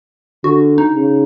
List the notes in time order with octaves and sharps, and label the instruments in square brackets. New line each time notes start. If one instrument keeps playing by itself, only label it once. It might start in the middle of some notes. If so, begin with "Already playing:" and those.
[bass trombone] D3 [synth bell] F#4
[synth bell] D#4
[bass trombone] C#3